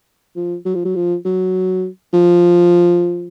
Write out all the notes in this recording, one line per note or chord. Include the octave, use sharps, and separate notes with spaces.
F3
F#3
F3
F#3
F3
F#3
F3